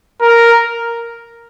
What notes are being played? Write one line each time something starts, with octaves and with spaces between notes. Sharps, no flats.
A#4